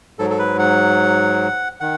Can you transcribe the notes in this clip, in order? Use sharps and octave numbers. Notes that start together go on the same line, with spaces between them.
G#2 F#3 A4
A4
B4
F#5
D#3 F#5